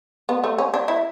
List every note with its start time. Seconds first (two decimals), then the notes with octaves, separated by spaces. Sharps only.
0.29 B3
0.44 A3
0.58 C#4
0.74 D4
0.88 E4